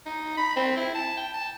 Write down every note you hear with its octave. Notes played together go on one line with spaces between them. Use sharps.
D#4
B5
C4
E4
A5
G5
A5